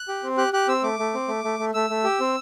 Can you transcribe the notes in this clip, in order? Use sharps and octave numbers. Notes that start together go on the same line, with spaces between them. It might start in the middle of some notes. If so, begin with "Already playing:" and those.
Already playing: F#6
G4
C4
G4 F#6
G4 F#6
C4 E6
A3 D6
A3
C4
A3
A3
A3
A3 E6
A3
G4
C4